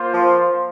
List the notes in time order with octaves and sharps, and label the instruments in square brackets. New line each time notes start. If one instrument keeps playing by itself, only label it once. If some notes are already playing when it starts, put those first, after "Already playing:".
Already playing: [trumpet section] A#3 F4 C5
[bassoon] F3